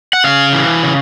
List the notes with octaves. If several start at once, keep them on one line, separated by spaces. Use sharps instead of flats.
F#5
C#3 F5
E3
C#3